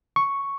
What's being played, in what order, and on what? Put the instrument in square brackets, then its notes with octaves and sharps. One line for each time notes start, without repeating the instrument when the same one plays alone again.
[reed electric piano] C#6